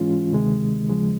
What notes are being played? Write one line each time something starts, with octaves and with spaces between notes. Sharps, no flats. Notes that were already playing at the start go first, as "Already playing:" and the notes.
Already playing: G#2 E3 G#3 C#4 F4
D2 C3 D#3 G#3
D#2 C#3 F3 G#3